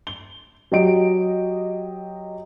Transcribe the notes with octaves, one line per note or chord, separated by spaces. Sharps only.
G7
F#3 G4 D#5 D7